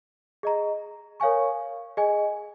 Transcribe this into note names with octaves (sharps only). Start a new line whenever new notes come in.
G#4 D#5 A#5
A#4 C#5 F5 G#5 C#6
G#4 D#5 G#5